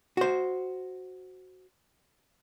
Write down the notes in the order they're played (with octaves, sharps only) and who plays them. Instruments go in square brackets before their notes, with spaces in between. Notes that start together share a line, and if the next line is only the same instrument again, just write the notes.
[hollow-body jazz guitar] F#4 C5